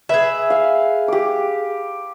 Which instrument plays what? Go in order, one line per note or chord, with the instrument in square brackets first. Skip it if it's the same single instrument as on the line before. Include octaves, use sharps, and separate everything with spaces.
[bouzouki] G#4 E5 [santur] B4 B5
[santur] F5
G4 D6